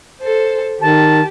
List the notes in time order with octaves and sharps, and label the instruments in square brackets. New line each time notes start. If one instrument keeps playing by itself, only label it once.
[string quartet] A4 C5
[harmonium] D#3 [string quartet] G4 [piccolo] A5